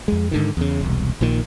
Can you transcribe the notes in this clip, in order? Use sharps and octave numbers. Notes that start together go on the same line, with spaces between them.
F2 G#3
G#2 D3 D#3
E2 C#3
E1 C2
A#1 A#2 D#3